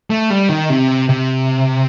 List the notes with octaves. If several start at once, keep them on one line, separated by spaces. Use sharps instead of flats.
A3
G3
D#3
C3
C3